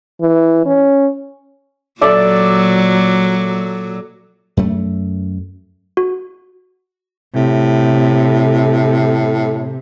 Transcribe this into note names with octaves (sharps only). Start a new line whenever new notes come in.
E3
C#4
A#2 F#3 A4 D5 E5
F#2 A3
F#4
A2 C3